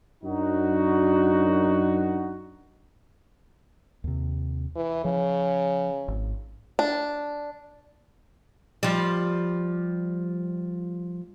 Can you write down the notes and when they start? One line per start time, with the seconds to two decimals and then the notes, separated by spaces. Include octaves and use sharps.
0.24 F#2 D4 D#4 F#4
4.04 D#2 C3
4.76 E3
5.05 C#3 F3
6.08 G#1
6.79 D4
8.83 F3 G3